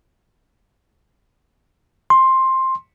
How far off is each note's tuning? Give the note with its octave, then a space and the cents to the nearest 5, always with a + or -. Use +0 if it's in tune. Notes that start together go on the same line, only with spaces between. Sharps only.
C6 +10